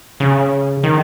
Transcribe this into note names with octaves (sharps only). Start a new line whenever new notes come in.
C#3
D#3